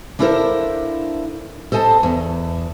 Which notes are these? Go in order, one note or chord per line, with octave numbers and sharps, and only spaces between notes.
A#3 D4 E4 A4 A#4 C5
A4 C5 D#5 G#5 A5
E2